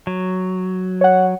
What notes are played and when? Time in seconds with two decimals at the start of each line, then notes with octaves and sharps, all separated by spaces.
0.07 F#3
1.01 C#5 F#5